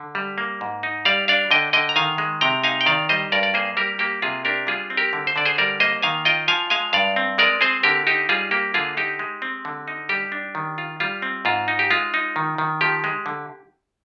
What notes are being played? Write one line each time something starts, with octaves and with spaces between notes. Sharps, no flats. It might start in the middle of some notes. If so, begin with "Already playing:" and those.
Already playing: D3
G3
A#3
G#2
D#4
G3 D5 F5
D4 D5 F5
D3 D#5 G5
D3 D#5 G5
A#5
D#3 F5 G#5
G#3
C3 G5 A#5
D#4 F5 G#5
G5
D#3 D5 F5
G3 C5 D#5
G2 A#4 D5
D5
A#3 G#4 C5
G3 G4 A#4
A#3 G4
C3 F4 G#4
D4 G4 A#4
G3 F4 G#4
C4
G4 A#4
D3
C5
D3 D5
G#4 C5
G3 A#4 D5
A#3 C5 D#5
D#3 F5 G#5
F4 D#5 G5
F3 F5 G#5
G#3 F5 G#5
G2 D5 F5
C4
G#3 A#4 D5
C4 G#4 C5
D3 G4 A#4
D#4 G4
G3 F4 G#4
A#3 G4
D3 F4 G#4
D#4 G4
G#3
C4
D3
D#4
G3 G4
D4
D#3
F4
G3 F4
C4
G#2 F4
D#4
G4
G#3 F4
D#4
D#3
D#3
F3 G4
G#3
D3